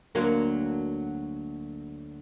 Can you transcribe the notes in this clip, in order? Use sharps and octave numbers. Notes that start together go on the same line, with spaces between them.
D2 F#3 A#3